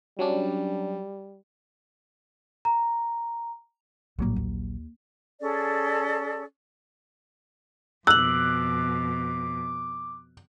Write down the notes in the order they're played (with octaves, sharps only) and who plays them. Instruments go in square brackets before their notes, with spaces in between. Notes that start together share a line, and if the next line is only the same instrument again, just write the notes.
[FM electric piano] F#3 C#4 D4 [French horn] G3
[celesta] A#5
[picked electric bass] A#1 F#3 A#3 [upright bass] A2 G3
[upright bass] D#2
[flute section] C#4 G#4 A4 D5
[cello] F2 B2 [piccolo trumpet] D6 [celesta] E6 F#7 [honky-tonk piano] F#6